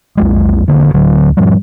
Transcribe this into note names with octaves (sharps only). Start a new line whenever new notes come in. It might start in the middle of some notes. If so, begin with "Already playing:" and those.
B1 F2 G#3
D#1 D3 A#3
D2 D3 F#3
G#2 F3 G3